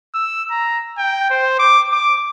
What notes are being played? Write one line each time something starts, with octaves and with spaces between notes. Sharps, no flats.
E6
A#5
G5
C5
D6
D6